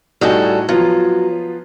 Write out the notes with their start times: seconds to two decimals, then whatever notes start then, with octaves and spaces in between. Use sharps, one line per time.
0.21 A2 G3 D#4 F#4 G#4 A4
0.69 F3 F#3 B3 F4